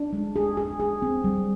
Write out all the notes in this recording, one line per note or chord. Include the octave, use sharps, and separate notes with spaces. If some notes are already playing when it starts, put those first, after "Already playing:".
Already playing: D4
G#3
G#4
G#4
G#4
C4
G3